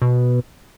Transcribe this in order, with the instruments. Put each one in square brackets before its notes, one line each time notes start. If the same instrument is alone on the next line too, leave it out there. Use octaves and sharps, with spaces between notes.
[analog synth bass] B2